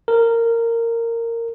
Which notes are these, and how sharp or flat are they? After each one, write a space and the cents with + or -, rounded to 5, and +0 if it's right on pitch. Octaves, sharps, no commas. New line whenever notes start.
A#4 -15